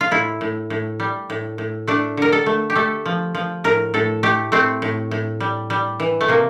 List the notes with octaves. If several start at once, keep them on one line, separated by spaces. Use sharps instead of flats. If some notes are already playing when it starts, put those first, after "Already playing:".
F4
A2 E4
A2
A2
G3
A2
A2
A3 D4
D3 A#4
A4
A3
G4
A3 A4
F3
F3
A2 A#4
A2 A4
A3 G4
A3 C4
A2
A2
G3
G3
E3
A3
C3 A#3